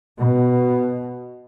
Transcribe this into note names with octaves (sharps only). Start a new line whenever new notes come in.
B2